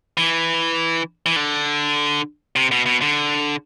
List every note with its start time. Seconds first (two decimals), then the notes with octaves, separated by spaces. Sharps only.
0.17 E3
1.26 E3
1.36 D3
2.56 C3
2.72 B2
2.86 B2
3.02 D3